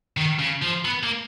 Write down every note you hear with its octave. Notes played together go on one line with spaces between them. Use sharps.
D#3
C#3
F3
B3
A#3